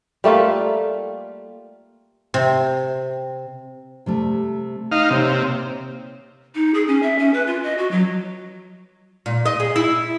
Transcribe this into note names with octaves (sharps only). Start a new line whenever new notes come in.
G3 A3 A#3 F4
C3
C3 G3 A3
D#4 F5
C3 A#3 G4 C#5
D#4
G#4
C#4
E5
C#4
B4
F4
D#5
F#4
F#3
A#2
D#5
G#4
E4